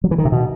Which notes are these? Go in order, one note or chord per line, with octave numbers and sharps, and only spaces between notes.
F#3
E3
D#3
C3
B2